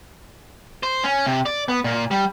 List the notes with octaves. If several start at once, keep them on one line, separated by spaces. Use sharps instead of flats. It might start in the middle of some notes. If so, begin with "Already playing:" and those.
C5
C#4
C3
D5
B3
A#2
G3